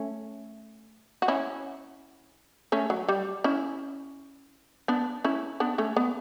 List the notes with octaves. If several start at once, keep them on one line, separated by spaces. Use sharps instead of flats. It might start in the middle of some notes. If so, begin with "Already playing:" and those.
Already playing: A3 C#4
F#4
C#4 E4
A3 C#4
F#3
G3
C#4 E4
B3 D4
C#4 E4
B3 D4
A3 C#4
B3